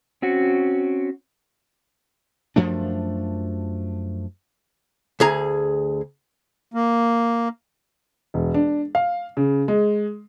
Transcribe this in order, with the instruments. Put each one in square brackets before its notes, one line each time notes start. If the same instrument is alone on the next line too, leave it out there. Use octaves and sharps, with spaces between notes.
[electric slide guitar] C4 C#4 F#4
[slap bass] F#2 F3 A3 D4
[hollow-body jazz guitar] D2 G#4 A#5
[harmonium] A#3
[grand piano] E1
D4
F5
C#3
G#3